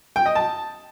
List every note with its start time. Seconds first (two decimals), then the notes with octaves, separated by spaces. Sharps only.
0.16 G5
0.26 D#5
0.35 A5